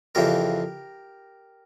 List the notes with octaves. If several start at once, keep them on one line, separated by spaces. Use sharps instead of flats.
F2 C#3 E3 G4 A#4